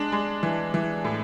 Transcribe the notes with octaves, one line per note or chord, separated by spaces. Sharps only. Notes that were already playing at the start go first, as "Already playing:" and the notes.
Already playing: G#3 D4
G#3
E3
E3
A2